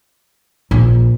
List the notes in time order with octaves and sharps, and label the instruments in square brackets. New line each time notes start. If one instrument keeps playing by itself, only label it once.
[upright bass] A#1